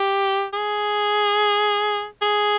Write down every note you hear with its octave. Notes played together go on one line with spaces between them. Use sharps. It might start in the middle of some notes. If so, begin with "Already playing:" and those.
Already playing: G4
G#4
G#4